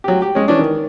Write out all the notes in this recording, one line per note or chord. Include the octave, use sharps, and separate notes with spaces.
F#3 G4
G4
G#3 C#4
E3 C#4 D4
D#3